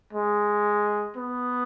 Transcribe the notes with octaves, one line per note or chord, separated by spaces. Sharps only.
G#3
B3